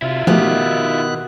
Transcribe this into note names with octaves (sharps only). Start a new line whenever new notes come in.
C3 E4 F4
B2 D#3 F3 A3 B3 G4 F#6